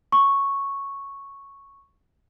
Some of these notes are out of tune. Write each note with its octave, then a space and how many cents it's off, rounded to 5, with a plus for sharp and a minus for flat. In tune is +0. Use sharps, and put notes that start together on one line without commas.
C#6 -5